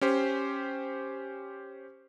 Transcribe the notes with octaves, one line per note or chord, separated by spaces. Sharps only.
C#4 G4 C5